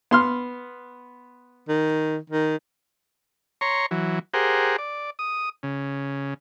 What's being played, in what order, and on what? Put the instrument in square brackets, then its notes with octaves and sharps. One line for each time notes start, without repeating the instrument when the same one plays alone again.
[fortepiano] B3 C6 F6
[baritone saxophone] D#3
D#3
[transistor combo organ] C#5 A#5 C6 C#6
E3 F#3
G4 G#4 A#4 C5 F#5
D5
D#6
C#3